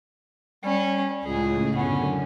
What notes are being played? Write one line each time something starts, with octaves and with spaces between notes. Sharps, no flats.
G3 C#4
C#2 A2 C#3 G#4
F#2 D3 B3 C#4